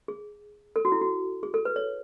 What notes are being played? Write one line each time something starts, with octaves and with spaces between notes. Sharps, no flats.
G#4
A4
F#4
E4
F#4
G#4
A4
B4
C#5